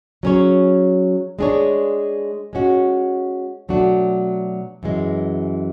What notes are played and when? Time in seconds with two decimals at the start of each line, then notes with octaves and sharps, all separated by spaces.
0.23 F#3 C#4 G#4 C#5
1.39 G#3 D4 G#4 C#5
2.53 G#3 C#4 F#4
3.69 B2 F#3 A3 D4 F#4
4.83 F#2 E3 G#3